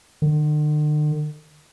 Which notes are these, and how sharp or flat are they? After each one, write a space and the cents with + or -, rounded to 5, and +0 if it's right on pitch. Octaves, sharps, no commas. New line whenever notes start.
D3 +45